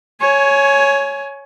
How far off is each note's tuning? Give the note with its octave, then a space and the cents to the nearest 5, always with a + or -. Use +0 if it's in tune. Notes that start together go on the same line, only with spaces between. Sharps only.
C#5 +0 G#5 +20